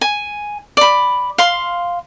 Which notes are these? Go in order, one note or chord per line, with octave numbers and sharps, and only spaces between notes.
G#5
D5 B5
F5 C6